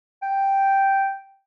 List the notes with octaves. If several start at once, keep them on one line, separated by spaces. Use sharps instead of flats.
G5